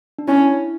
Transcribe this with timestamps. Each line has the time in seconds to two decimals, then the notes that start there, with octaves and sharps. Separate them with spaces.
0.18 D4
0.28 C#4 E4